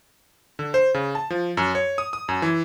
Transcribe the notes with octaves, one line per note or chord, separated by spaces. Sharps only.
D3
C5
C#3
A5
F3
F#2
C#5
D#6
D#6
F#2
E3